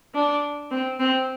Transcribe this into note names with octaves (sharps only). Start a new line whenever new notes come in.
D4
C4
C4